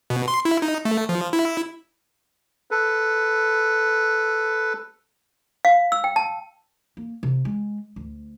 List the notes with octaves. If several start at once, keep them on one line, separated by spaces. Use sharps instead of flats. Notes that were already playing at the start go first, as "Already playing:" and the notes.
B2
C6
E4
D#4
A3
F3
E4
A4 B4
F5
E6
G5
A5
A#3
C3
G#3
D2